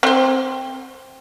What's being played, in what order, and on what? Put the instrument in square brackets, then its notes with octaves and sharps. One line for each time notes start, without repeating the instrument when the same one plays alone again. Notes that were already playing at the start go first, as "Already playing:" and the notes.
[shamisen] C4 C5